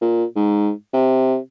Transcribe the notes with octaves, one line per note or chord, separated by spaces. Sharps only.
A#2
G#2
C3